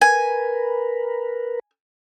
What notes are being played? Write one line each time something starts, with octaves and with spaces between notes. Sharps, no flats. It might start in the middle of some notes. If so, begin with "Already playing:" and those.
A#4 B4 G#5